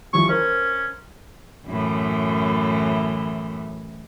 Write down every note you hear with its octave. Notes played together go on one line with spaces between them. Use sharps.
E3 F3 G3 C#6
C#4 A#4 C5
F#2 A2 E3